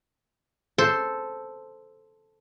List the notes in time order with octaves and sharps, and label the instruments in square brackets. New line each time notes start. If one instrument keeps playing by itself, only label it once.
[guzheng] A4 C5